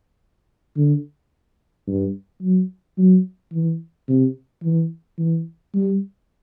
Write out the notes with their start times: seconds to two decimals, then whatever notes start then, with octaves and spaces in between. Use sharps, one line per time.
0.77 D3
1.87 G2
2.42 F#3
2.98 F#3
3.53 E3
4.09 C3
4.64 E3
5.19 E3
5.75 G3